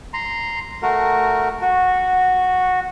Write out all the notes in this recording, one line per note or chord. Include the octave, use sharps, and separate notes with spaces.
A#5 C6
A3 F#4 A#4
F#4